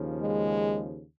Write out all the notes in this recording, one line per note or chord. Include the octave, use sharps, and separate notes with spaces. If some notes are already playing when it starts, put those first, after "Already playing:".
Already playing: D#2 C#3 F3
G#3